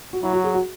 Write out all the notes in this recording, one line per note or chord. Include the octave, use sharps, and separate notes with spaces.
F#4
F#3 E4
F#4
G#4
F#4